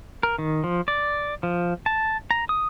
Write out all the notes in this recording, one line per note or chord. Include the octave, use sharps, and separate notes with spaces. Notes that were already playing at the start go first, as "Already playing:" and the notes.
A#4
D#3
F3
D5
F3
A5
A#5
D#6